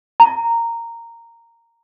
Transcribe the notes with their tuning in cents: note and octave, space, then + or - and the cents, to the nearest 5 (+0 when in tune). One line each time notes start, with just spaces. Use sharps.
A#5 -10